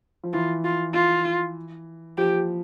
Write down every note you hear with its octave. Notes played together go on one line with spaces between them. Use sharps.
F3
E3 F4
F4
F4
F3 G4